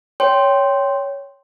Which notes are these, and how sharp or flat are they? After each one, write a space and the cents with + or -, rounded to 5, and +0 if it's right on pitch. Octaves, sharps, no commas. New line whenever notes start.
C#5 +10 G5 +0 C6 +0